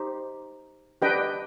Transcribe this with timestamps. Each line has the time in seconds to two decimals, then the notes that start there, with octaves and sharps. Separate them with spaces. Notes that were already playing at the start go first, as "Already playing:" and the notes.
Already playing: D#4 G4 C5
1.02 D4 G4 B4 D#5 G5